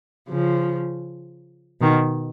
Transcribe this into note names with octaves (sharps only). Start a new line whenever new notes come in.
C#3 F3
B2 D#3